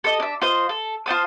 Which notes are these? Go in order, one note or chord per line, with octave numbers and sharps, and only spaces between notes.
A4 D#5
D4 E5
F4 C5 D#5
A4
F4 C5 A5 D#6